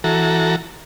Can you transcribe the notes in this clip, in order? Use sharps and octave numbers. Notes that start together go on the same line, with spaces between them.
E3 F#4 A4 A#5